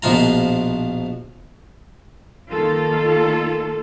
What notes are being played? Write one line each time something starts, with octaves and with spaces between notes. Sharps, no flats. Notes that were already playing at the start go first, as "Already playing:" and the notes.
A#1 B2 F3 F4 A#5
D#3 A#3 F4 A4